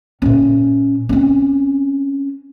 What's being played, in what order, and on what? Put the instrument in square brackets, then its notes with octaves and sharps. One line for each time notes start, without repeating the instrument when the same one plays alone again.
[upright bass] A#2 C#4
C4 C#4